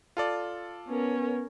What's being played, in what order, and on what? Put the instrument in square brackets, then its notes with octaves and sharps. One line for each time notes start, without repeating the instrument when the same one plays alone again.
[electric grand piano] F4 A4 D5
[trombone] B3 [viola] C#4 A#4